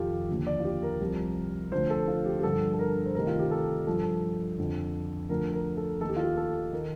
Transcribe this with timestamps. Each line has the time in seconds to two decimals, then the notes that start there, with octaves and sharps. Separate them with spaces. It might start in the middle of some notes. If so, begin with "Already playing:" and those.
Already playing: F2 C3 D#3 F4 G4 A4
0.29 D#2 D3 F3
0.47 D5
0.60 F4
0.64 G4
0.83 A#4
1.00 C2 C3 F3
1.72 D2 D3 F3 C5
1.90 A4
2.08 F4
2.26 G4
2.39 G4
2.43 G2 D3 F3 A4
2.74 A4
2.79 A#4
3.06 C5
3.15 D2 C3 D#3 A#4
3.27 F4
3.39 G4
3.51 A4
3.87 G2 F3 A4
4.58 F2 D3 F3
5.29 D2 D3 F3 A#4
5.54 A#4
5.77 A4
6.01 D#2 D#3 A4
6.08 G4
6.16 F4
6.23 G4
6.37 A4
6.72 D#3 A#4